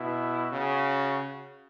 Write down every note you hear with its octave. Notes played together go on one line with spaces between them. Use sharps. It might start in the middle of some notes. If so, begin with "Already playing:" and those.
Already playing: B2 E4
C#3 F#4